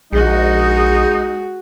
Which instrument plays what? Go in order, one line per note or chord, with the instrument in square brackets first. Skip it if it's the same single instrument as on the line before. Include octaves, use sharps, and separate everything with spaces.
[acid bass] A#1 [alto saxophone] G#3 [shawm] D#4 [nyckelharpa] F#4 G#4